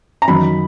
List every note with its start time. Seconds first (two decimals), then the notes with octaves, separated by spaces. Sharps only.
0.22 A#5
0.28 F#2 D#3 B5